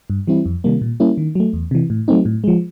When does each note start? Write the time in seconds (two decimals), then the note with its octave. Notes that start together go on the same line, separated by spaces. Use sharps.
0.10 G2
0.27 E3 G3 C4 E4
0.46 F2
0.64 C3 D#3 G3 A#3
0.82 A#2
1.00 G3 A#3 C#4 E4
1.18 D#3
1.35 F#3 A3
1.53 E2
1.71 C3 E3
1.90 A2
2.08 F#3 A3 C4 D#4
2.25 A2
2.44 F3 G#3